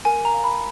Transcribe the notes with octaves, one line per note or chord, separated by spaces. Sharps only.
A#4 G#5
A#5
F5
B5